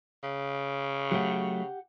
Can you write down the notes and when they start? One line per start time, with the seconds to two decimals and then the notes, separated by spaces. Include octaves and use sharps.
0.23 C#3
1.11 F#3 A3 G4 F#5